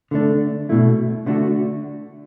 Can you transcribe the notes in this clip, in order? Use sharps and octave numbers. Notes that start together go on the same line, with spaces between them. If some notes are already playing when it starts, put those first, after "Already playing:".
D3 A3 D4
B2 A3 E4
D3 A3 D4 F#4